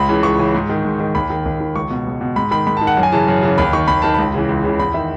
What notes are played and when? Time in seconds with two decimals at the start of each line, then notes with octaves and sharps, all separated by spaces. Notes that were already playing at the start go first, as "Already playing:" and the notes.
Already playing: C#2 B5
0.09 C#3 E3
0.23 C#2 C#6
0.39 C#3 E3
0.55 G#2
0.69 D#3
0.85 G#2
1.00 D#3
1.15 D#2 B5
1.30 D#3
1.45 D#2
1.61 D#3
1.75 C#2 C#6
1.90 B2
2.06 C#2
2.21 B2
2.36 G#2 B5
2.51 D#3 B5
2.67 G#2 B5
2.77 A5
2.81 D#3
2.87 F#5
2.97 F#2
3.03 G#5
3.12 C#3 E3 A5
3.28 F#2
3.43 C#3 E3
3.58 D#2 B5
3.73 D#3 C#6
3.88 D#2 B5
4.02 D#3 A5
4.14 C#2 B5
4.34 C#3 E3
4.49 C#2
4.64 C#3 E3
4.79 E2 B5
4.94 D#3 E5